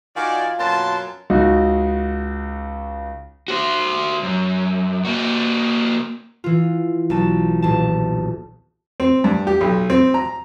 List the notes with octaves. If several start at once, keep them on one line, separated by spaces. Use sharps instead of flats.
D#3 F4 F#4 D5 G#5
F#2 B2 A#3 A5 C6
C#2 D#4 F#4
F#4 C5
F#2
A#3 F#4
E3 F4
B1 A5
D#1 A5
C4
G2
G4
B1
C4
A#5